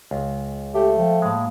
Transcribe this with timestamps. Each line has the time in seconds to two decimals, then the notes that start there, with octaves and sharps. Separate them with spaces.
0.11 C#2 G#3
0.75 A3 G4
0.96 F3 F5 G5
1.22 A2 G#3 A#3 F5 A5